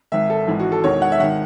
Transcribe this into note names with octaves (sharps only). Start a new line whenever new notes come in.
G#1 G#2 D#3 E5
A4
G#1 G#2 E3
F#4
A4
E1 E2 D#3 C#5
F#5
E5
G#1 D#3 F#5